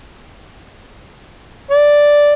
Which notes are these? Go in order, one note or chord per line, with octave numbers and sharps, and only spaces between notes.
D5